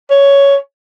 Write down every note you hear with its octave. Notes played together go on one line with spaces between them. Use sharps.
C#5